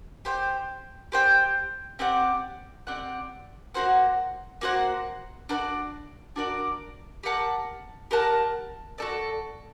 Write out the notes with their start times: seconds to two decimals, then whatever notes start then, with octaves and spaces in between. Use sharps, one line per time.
0.25 G4 C5 G5
1.12 G4 C5 G5
1.99 C4 G4 D5 F#5
2.87 C4 G4 D5 F#5
3.74 A#3 F#4 C5 F#5
4.61 A#3 F#4 C5 F#5
5.49 D4 F#4 A#4 D5
6.36 D4 F#4 A#4 D5
7.23 G4 A#4 F#5 A5
8.11 G4 A#4 F#5 A5
8.98 F#4 A4 D5